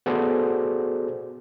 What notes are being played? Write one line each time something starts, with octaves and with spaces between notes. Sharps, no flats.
B3 F#4 G#4 A4 C5 D5